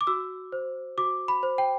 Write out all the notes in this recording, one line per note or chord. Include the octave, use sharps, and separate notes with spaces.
D6
F#4 E6
C5
F#4 D6
B5
C5
G5